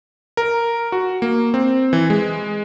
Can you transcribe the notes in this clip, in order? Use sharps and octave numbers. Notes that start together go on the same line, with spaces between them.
A#4
F#4
A#3
C4
E3
G#3